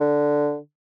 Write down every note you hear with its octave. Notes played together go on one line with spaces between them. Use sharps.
D3